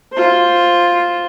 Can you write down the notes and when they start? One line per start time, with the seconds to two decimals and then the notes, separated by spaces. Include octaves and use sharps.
0.12 F4 C5